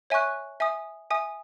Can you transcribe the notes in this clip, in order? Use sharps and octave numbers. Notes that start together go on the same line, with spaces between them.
C#5 E5 G#5 C#6 F#6
E5 G#5 D#6
E5 G#5 D#6